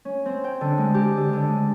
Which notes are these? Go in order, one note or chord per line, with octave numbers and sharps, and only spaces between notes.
C#4
C4
G5
D3
G#3
G4
D3
D3
G#3